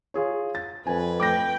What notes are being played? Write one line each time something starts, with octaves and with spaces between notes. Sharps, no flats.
F4 G#4 C#5
A6
F2 B4 G#5
A3 G5 D6 A#6